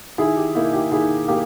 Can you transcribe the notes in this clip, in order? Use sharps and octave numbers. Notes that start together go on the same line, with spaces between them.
D#3 E4 G#4
G4
A#3 D#4 E4
G4
D#3 E4 G#4
A#3 G4